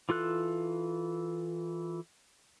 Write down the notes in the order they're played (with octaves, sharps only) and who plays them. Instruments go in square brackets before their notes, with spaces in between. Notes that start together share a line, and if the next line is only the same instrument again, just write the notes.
[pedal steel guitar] E3 F4 A4 F#6